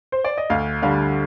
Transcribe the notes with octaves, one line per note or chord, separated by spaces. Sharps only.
C5
D5
D#5
D2 F5
D3 G3 F5